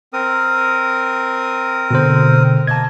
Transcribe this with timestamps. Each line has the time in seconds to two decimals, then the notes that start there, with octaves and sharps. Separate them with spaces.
0.13 C4 A#4 D#6
1.91 B2 D3 C5
2.67 A#3 D#5 A5 G#6